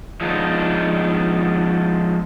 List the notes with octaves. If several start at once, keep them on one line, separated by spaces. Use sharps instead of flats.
F3 G#3 B3 D4 D#4